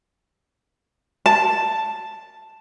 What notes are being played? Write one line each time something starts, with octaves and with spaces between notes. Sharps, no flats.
A5